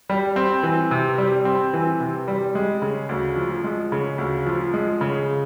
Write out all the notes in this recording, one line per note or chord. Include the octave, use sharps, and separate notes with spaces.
G3
C4
E3
C3
G3
C4
E3
C3
G3
G#3
C#3
D2
F3
G#3
C#3
D2
F3
G#3
C#3